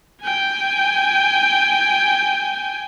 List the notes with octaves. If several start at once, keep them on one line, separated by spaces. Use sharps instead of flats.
G5 G#5